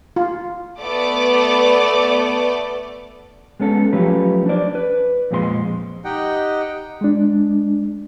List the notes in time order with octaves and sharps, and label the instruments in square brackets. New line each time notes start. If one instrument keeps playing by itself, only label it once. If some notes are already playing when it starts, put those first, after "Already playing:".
[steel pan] F4
[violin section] A3 B3 D5 D6
[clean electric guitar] G#3 B3 C#4 A4
F3 F#3 A3 C#4 G4 B4
D4 C5 D5
B4
F2 A#2 G#3 G4 C6
[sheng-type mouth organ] D#4 G4 D#5 F#5 G5
[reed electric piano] G#3 D4